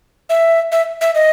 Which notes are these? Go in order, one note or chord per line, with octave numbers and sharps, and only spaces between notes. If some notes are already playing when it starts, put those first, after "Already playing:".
E5
E5
E5
D#5